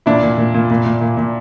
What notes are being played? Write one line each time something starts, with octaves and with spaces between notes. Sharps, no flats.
A#2 D4 E4
A#2
A#2
A#2
A#2
A#2
A#2
A#2